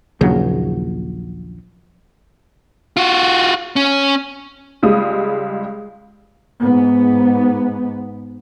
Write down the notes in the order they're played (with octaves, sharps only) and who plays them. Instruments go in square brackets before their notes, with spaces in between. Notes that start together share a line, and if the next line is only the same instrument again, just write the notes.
[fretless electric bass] A#1 D#2 C#3 F#3
[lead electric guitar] F4 F#4
C#4
[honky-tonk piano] C#2 G3 G#3 D#6
[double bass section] G#2 B3